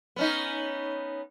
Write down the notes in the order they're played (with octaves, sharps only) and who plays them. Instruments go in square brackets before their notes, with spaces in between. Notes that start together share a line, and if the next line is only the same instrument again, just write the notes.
[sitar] B3 C#4 D#4